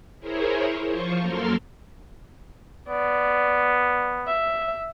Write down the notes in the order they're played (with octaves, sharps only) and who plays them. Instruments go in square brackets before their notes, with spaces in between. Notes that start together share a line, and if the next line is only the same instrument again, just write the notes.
[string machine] E4 G#4 A#4 C5 C#5
F3 F4 C5 C#6
F#2 A#3 A4 A#4 C6 F6
[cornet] B3 [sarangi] D5
[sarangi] E5